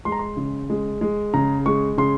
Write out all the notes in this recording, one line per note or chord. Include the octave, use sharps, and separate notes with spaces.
G#3 C6
A#5
C6
C#3
G#3
G#3
C#3 A#5
G#3 C#6
C#3 C6